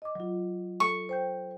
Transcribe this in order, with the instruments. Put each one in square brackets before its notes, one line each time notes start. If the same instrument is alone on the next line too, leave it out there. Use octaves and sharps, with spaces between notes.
[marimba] D#5 D6
F#3 F4
[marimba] A4 [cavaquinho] C#6
[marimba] C5 G5 G6